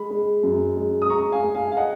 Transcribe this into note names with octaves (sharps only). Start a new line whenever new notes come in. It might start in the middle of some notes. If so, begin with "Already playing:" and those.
Already playing: G#3 B5
G#3
F#2
G#3
D#6
G#3 A#5 C#6
F5 G#5
G#3
F5 G#5
F5
D#5 F#5